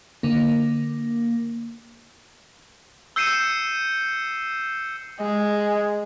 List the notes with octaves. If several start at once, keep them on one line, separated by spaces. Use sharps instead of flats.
D3 A#3
E6 G6 C7 C#7 D#7 E7
G#3